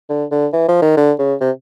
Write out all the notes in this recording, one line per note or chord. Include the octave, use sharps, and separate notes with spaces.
D3
D3
E3
F3
D#3
D3
C#3
C3